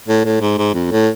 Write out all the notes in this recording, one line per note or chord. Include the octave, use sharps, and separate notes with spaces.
A2
A2
G#2
G#2
F2
A2